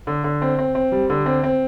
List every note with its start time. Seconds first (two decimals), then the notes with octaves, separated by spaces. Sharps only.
0.07 D3
0.24 D3
0.42 C4
0.59 C4
0.75 C4
0.92 G3
1.10 D3
1.26 C4
1.43 C4